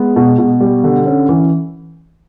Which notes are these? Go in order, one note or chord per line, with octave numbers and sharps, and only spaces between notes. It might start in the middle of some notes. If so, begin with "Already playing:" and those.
Already playing: G#3 B3
B2
B2
G3
D3
C#4
E3